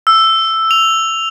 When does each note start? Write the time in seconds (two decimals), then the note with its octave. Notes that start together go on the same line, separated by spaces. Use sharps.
0.07 E6
0.71 F7